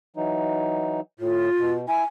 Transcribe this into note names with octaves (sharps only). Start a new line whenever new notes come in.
E3 F#3 D#4
A2 F4
B2
E4 G#5